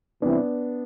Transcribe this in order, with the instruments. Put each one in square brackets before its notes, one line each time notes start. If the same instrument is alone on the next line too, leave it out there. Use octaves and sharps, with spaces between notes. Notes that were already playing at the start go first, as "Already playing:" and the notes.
[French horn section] C3 E3 G3 C4 E4 [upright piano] B3 D4